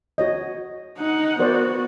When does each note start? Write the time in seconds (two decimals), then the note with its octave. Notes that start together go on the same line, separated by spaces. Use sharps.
0.18 F#4 C#5 D#5
0.98 D#4 F#5
1.39 B3 F#4 A#4 C5 D5